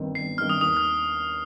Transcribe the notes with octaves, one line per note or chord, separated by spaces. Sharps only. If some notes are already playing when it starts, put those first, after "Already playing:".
Already playing: G1 G2 D#3 C4
G1 C7
G2 D#3 C4 F6
D#6
D#2 D#6
F6